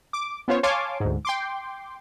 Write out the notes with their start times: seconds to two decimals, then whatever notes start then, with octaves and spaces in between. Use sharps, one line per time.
0.13 D6
0.48 B3 C#4 F4 C5 C#5
0.63 C#5 F5 G#5 A5 C6 D6
1.00 D2 G#2
1.25 G5 C6 D6